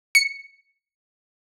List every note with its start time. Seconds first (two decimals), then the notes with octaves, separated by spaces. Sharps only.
0.15 C#7